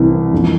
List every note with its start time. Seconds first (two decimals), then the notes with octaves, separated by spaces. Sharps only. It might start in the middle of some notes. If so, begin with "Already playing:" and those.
Already playing: C2 C3 E3
0.33 F2 E3